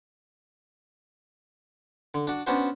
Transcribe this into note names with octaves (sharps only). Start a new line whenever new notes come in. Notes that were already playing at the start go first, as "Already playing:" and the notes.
D3
D4 F#4
B3 C#4 D4 F#4 C5